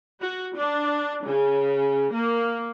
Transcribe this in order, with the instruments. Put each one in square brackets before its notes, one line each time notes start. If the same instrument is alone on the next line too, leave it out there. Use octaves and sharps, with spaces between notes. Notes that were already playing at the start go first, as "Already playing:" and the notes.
[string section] F#4
D4
C#3
A#3